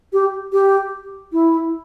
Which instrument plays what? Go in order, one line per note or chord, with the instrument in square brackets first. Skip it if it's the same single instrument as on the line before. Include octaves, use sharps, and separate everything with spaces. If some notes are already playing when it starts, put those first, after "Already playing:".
[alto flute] G4
G4
E4